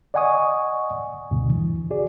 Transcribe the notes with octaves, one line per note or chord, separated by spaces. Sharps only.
D5 D#5 F#5 G#5 C#6 D#6
D2 G2 B2
E3
F#4 G#4 D5